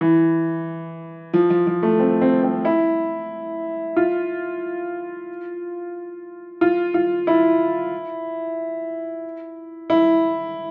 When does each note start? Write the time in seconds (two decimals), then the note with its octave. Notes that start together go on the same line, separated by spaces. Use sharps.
0.01 E3
1.34 F3
1.50 F3
1.67 F3
1.83 A3
2.00 C4
2.21 C4
2.43 C4
2.65 E4
3.97 F4
6.61 F4
6.94 F4
7.27 E4
9.90 E4